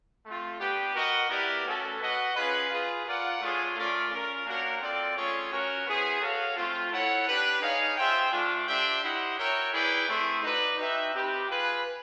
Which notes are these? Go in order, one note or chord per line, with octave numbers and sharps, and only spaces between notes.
A3 C4 F4
B3 D4 G4
F#4 A#4 D#5 F#5
B3 E4 G4 A#4 D5
A3 C#4 F#4 A4
F#4 B4 D#5 F#5
C#4 F4 G#4 B4
F4 G#4 B4
F4 A#4 D5 F#5
A3 D4 F4 G#4 C#5
A3 C#4 F4 A#4 D5
C#4 F4 A#4
A#3 D4 F#4 A#4 C#5
C4 F4 A4 D5
A3 C#4 F4 G#4 C#5
C#4 F#4 A#4 C#5
B3 E4 G#4 C5
F#4 A4 C#5 F5
A3 C4 F4
E4 A4 C#5 F#5
D4 G4 B4
D#4 G#4 C#5 F5
F4 G#4 C5 E5 G5
A3 D4 F4
D4 G4 C5 E5 G5
E4 G4 C5 D#5 F#5
F#4 A#4 C#5 E5 G5
E4 G#4 B4 D5 G5
A3 C4 E4 G#4 C5
D#4 F#4 B4 D5
D#4 F#4 B4 E5 G5
C4 D#4 G4 B4
F4 G#4 B4